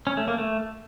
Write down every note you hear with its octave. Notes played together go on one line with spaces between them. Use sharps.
C#4
A3
A#3
A3